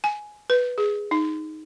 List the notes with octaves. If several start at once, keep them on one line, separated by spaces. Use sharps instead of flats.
G#5
B4
G#4
D#4